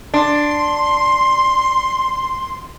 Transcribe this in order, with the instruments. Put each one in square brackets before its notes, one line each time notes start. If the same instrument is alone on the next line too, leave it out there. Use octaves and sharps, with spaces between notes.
[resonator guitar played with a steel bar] D4 [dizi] C6